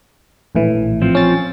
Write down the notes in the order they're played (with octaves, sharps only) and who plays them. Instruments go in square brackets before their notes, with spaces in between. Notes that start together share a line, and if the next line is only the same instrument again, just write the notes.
[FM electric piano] A#1 A2 E3
[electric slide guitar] F3 C4
[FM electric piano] C#4 A6